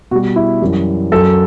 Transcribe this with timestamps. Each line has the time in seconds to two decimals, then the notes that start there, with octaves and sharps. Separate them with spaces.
0.11 B2 F#4
0.15 G3
0.36 E4
0.62 F#2 E3 G3
1.12 F#2 F#3 A4